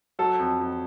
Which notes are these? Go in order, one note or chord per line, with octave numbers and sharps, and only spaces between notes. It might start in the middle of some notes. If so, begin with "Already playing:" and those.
F#3 A4
F2
F2